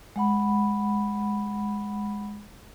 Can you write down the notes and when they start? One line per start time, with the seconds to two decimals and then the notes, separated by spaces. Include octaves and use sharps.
0.16 G#3 F#5 B5